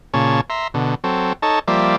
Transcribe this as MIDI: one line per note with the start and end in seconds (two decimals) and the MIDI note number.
0.14 0.41 46
0.14 0.41 49
0.14 0.41 73
0.14 0.41 81
0.50 0.68 76
0.50 0.68 82
0.50 0.68 84
0.74 0.95 47
0.74 0.95 50
1.04 1.33 54
1.04 1.33 60
1.04 1.33 69
1.42 1.59 63
1.42 1.59 69
1.42 1.59 73
1.42 1.59 81
1.68 1.96 53
1.68 1.96 55
1.68 1.96 58
1.68 1.96 74
1.68 1.96 76